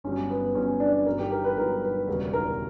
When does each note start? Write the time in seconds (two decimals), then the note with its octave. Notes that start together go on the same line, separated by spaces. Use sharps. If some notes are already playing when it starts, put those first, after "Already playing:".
0.04 G1 G2 F#3 C#4
0.30 B3
0.55 G1 G2 F#3 C#4
0.80 D4
1.06 G1 G2 F#3 A#4
1.19 G4
1.32 A#4
1.44 B4
1.57 G1 G2 F#3 A#4
1.82 B4
2.08 E1 D2 C#3 G3 C#4 A#4
2.33 A#4